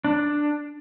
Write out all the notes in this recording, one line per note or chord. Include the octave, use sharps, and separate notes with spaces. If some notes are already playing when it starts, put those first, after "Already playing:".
D4